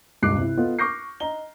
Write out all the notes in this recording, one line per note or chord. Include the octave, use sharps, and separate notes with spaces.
E1 C#2 G2 D6 F#6 C7
C3 E4
B3 F4 A4 D#5
C#6 D6 F6 G6 A#6 C7
D#5 A#5 G7